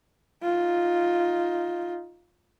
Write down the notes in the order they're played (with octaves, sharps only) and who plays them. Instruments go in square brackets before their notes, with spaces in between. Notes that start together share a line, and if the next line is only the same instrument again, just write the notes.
[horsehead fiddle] D#4 F4